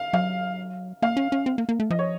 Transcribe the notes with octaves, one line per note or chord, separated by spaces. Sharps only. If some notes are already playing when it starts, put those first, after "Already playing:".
Already playing: F5
F#3 F5
A#3 F5
C#4
C#4
C4
A#3
A#3
A3
F3 D#5
C#5